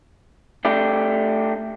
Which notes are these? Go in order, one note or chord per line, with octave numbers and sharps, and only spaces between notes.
A3 D4 G4